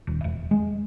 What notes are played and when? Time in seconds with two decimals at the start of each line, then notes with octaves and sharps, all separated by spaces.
0.07 D#1
0.24 E1
0.51 G#3